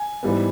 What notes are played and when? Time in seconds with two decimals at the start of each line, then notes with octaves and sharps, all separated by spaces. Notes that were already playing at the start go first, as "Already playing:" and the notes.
Already playing: G#5
0.23 G#2 E3 G3 B3